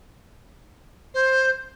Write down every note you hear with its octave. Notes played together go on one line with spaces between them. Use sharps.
C5